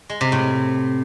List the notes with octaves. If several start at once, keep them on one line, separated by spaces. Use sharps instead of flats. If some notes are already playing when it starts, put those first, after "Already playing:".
G#3
C3
A2